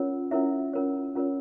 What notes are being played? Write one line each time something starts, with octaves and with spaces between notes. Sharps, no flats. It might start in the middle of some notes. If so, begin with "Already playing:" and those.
Already playing: C#4 F4 A#4 C#5
C#4 E4 F4 A#4 C#5 E5
C#4 F4 A#4 C#5
C#4 F4 A#4 C#5